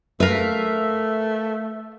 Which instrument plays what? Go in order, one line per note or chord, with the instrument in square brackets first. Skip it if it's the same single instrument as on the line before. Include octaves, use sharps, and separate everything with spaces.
[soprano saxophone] A3 [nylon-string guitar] A#4 B4 [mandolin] E5 F5